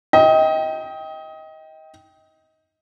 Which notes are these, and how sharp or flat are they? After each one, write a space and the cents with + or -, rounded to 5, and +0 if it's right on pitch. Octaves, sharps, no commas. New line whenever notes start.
D#5 +25 G5 +0